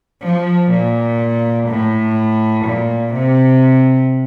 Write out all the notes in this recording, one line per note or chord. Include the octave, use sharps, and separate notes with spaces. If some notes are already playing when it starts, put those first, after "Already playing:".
F3
A#2
A2
A#2
C3